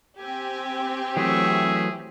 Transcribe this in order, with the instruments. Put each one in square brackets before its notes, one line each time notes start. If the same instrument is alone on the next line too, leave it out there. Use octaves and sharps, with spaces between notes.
[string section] C4 G4 [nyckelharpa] G#5
[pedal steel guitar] E3 F#3 A3 [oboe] G#4 [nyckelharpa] E5 C#6